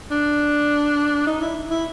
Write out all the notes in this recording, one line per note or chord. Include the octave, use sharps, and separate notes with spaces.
D4
D#4
E4
E4